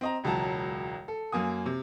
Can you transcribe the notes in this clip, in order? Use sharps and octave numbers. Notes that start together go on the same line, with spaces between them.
C4 D#5 A#5
E1 C#2 F#3 A5 A#5
A4
F#2 A#3 G#5 D#6
C3